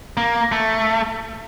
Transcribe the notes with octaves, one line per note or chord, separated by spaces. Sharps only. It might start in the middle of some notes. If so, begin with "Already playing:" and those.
A#3
A3